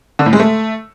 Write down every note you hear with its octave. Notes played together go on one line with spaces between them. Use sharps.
D3
A2
G#3
A3